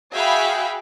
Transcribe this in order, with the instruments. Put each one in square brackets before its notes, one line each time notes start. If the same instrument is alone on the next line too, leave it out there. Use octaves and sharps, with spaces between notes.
[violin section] F#4 G#4 E5 F5 G5 B5